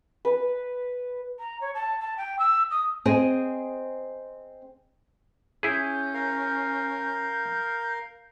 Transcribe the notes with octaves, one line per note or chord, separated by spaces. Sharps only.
B4
A#5
C#5
A5
A5
G5
E6
D#6
C4 G#4 D#5 G#5
C#4 E4 G#4 G6
A#4 F5